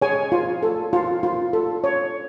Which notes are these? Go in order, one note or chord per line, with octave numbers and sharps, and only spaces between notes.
G#4 C#5 G#5
F4
A4
F4
F4
A4
C#5